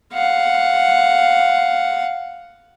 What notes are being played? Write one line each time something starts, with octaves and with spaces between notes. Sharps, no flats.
F5 F#5